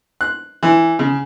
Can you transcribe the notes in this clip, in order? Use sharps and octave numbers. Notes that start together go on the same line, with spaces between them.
F#6
E3
C#3